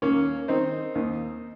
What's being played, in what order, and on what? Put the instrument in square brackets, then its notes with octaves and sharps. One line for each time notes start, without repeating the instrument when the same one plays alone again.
[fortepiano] D#2 A#3 C#4
D#3 C4 D#4
D#2